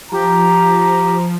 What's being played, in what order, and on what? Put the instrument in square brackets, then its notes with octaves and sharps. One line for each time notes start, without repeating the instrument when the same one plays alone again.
[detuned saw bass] F3 [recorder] G4 [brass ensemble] A#5